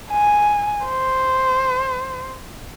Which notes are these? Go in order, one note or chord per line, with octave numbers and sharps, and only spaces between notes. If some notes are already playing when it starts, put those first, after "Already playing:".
G#5
C5